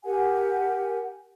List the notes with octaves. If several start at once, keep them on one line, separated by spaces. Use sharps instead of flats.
G4 A#4 F#5 G#5